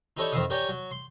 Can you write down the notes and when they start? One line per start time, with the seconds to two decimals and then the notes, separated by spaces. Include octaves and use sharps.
0.17 D#4 E4 G4 A4 C#5 D5
0.32 F2 D#3 E4 E5 F5 D#6
0.50 G4 A#4 C#5 D5 G5 G#5
0.69 F#3
0.91 C6